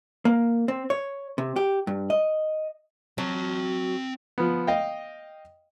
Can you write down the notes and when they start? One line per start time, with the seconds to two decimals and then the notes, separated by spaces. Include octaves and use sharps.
0.25 A#3
0.68 C4
0.90 C#5
1.38 C3
1.56 G4
1.87 G2
2.10 D#5
3.18 F#3 C4 A5
4.38 F3 B3
4.67 D#5 F5 G5